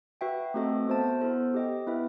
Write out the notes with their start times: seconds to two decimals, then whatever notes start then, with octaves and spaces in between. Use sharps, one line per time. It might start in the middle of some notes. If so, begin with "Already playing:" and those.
0.21 F#4 B4 E5 G5
0.54 A3 C4 F#4 A4 D#5
0.88 B3 F#4 C5 E5 A5
1.21 B3 E4 A4 C5
1.54 G4 D#5 G5
1.87 B3 E4 B4 E5